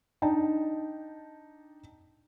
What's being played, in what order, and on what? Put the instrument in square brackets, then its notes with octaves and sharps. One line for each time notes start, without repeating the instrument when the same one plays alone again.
[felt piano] D4 D#4 G5 A5